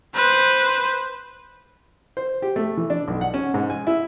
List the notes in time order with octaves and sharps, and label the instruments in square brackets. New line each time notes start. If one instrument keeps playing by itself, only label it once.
[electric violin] B4 C5
[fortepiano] C5
G4
A3
E3
D4
B1
F#5
C#4
G#2
G#5
E4